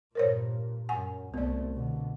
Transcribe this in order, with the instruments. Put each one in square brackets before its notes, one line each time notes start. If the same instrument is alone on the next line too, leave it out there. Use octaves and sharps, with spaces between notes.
[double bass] G2 A#2 [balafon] A#4 C5 C#5
[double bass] F#2 [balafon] F#5 G#5
[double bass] C2 A3 [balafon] B3 D5
[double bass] B2 D3